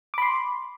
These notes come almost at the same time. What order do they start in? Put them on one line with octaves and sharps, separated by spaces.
D6 B5 C6